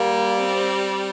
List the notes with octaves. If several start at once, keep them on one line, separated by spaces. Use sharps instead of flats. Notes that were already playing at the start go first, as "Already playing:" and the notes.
Already playing: G3 A#3
C4